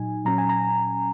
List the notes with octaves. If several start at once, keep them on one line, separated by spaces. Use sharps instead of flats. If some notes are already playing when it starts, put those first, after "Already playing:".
Already playing: A#2 F#3 D#4 G#5
A#2 F#3 C#4 A#5
G#5
A#5